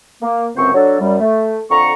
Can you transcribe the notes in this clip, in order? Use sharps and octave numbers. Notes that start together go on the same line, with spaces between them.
A#3
C#2 F#2 C3 C4 C5 C#6
F#3 D4 A4
F#2 G3
A3
F2 D3 A#5 C#6